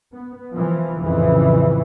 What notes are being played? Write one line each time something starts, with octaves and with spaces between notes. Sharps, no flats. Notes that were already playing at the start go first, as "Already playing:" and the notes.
B3
E3 F3
A1 F2 C#3 E3